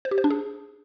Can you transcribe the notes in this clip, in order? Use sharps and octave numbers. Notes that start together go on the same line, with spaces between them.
C5
G4
C5
D4
G#4